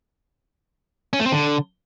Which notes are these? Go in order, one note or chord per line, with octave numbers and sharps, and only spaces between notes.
C#4
A3
C4
D3